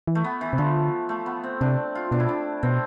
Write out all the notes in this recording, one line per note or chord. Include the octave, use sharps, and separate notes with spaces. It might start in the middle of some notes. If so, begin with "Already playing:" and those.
E3
A3
B3
E3
C3
D3 F3
A3
B3
C4
C3 D4
F4
B2 D4
E4
D4
B2 C4